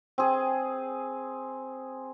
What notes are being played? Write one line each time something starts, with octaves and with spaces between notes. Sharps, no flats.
C4 G#4